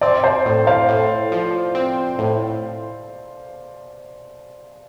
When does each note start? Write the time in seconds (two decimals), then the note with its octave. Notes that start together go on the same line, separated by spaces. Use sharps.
0.01 C4 D5
0.24 C5
0.45 A2
0.67 C5 F5
0.89 A2
1.32 F3
1.75 C4
2.19 A2